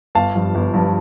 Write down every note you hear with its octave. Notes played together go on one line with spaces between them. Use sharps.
G1 F5 A5
G2 F3
G1
G2 F3